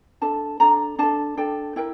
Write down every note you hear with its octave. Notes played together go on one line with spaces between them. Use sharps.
D4 A4 A5
D4 A4 A#5
D4 A4 A5
D4 A4 G5
E4 A#4 G5